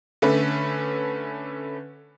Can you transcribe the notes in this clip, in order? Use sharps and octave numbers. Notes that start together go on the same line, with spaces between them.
D3 A3 C#4 B4